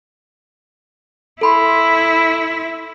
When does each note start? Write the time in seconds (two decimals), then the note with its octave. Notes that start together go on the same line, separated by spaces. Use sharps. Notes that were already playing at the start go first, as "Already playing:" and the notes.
1.41 E4 A4 B5 C6